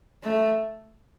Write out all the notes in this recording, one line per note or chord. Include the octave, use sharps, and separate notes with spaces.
A3